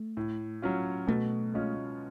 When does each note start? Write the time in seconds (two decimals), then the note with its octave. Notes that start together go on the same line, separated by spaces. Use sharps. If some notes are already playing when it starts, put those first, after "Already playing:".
Already playing: A3
0.17 A2
0.62 F#3 C#4 F4
1.07 B2 A3
1.54 G#3 C#4 F4